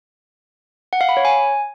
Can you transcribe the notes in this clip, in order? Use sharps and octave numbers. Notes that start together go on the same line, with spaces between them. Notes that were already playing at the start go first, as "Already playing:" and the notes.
F#5
F5
B5
C#5
G#5